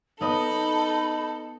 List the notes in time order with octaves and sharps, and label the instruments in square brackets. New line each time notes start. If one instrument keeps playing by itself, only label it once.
[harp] B3 D#5 [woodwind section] D#4 [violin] A4 [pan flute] B5